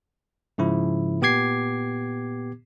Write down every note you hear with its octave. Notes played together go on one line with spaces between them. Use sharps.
G#2 C#3 F3 E4
A#2 B3 G4 D6 G#6 C7